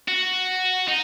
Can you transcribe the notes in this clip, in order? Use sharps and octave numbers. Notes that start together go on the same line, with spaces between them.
F#4
D#4